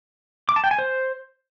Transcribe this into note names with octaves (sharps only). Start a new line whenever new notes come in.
D6
A5
G5
G#5
C5